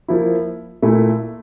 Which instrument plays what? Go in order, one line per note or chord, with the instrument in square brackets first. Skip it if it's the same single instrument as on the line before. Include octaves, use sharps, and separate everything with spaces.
[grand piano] F3 A#3 E4
A#2 A3 E4